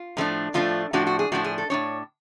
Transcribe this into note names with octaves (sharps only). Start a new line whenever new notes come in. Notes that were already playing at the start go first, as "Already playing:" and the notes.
Already playing: F4
A2 F3 A3 D4
A2 F3 A3 D4 F4
A2 F3 A3 D4 F#4
F#4
G#4
A2 F3 A3 D4 F#4
G#4
A4
A2 G#3 D4 C#5